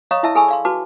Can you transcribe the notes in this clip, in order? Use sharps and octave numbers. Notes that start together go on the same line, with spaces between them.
C#5 D#5 F5 A#5 C#6 D#6
E4 D#5 E5 A5 E6
G#4 A4 G#5 B5 C#6 E6
D5 F5 C6
F#4 B4 A5 D6